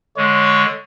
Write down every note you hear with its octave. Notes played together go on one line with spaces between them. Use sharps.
D3 G#3 C#5